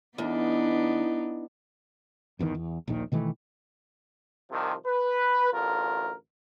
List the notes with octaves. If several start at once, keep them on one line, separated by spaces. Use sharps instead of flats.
E2 B3 D4 D#4
G1 E2 A#2 D#3
E2
A#1 D#2 A#2 D#3
B2 D#3 E3 A3
C2 C3 D#3 F3
B4
A1 D2 F4 A#4